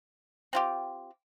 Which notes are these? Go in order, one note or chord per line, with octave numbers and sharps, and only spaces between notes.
C4 F4 G4